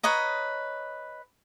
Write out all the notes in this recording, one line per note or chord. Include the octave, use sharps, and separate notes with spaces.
B4 C#5 D#5 A#5